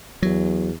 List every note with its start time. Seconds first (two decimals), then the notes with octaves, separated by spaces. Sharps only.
0.22 E2 F#3